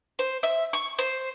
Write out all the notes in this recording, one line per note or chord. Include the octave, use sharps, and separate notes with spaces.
C5
E5
C#6
C5